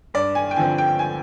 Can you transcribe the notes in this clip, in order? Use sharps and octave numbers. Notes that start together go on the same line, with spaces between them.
G2 D5
G#5
G5
D3 F3 C4 G#5
G5
G#5